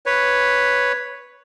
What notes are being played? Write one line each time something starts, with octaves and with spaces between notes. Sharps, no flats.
B4 C#5